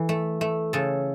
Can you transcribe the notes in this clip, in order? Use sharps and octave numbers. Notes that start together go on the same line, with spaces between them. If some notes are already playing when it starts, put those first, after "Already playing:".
Already playing: E3 A4
A3
A3
C#3 A4